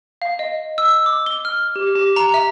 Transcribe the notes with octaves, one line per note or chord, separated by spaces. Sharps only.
F5
D#5
E6
D6
G7
F6
G4
G4
A#5
E5